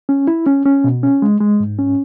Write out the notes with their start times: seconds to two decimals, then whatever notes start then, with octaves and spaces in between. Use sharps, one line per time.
0.09 C#4
0.27 E4
0.46 C#4
0.66 C#4
0.84 B2
1.03 C#4
1.22 G#3
1.41 G#3
1.60 G#2
1.78 C#4